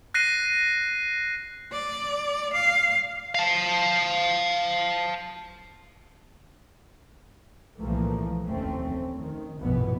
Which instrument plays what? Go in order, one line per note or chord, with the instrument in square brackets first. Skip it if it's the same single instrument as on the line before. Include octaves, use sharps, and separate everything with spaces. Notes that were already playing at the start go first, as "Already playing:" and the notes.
[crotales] F#6 A#6 C7 D#7
[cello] D5
F5
[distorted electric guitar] F5 A5
[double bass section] C2 A#2 E3 F3 A3 A#3
F1 D#2 A3 C4 C#4
D#3
F1 A#1 G2 B2 E3 B3